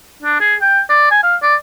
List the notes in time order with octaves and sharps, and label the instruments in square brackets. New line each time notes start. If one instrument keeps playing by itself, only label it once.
[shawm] D4
G#4
G5
D5
G#5
F5
D5